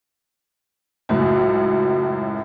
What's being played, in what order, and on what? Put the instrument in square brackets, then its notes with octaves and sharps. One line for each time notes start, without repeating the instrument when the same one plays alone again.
[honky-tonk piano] C#2 F#2 A2 [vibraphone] F#4